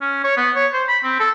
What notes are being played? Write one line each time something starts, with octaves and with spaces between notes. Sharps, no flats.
C#4
C#5
B3
C#5
C5
B5
C4
A4